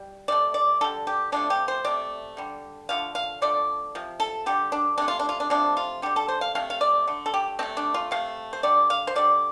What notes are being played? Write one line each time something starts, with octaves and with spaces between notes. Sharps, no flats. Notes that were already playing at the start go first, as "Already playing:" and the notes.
Already playing: G3
C3 A3 D5
D5
D3 G3 A4
G4
C3 F3 A3 D4
G4
C5
C3 A3 D5
D3 G3
D3 F3 A3 F5
F5
D3 F3 A3 D5
C3 F3
A4
D3 G3 G4
D4
C3 A3 D4
F4
D4
F4
D4
C3 F3 A3 D4
F4
D3 G3 G4
A4
C5
F5
C3 A3 F5
F5
D5
D3 A3
A4
G4
C3 A3 C4
D4
F4
C3 A3 F5
C5
D3 G3 D5
F5
C5
D3 G3 D5